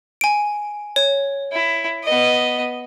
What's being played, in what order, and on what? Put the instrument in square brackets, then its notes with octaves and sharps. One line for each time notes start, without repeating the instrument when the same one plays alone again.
[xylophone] G#5 D7
C#5
[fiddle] E4
B3 D#5